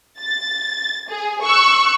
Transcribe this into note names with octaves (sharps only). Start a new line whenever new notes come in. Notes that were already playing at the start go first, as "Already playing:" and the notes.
A6
G#4
C#6 E6 F#6